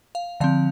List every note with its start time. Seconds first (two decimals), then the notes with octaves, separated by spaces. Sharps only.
0.15 F5
0.40 D3 F3 C4 F5